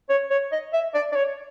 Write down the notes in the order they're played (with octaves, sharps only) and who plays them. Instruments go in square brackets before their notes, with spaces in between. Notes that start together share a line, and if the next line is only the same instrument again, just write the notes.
[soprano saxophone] C#5
C#5
D#5
E5
D5
D5
C#5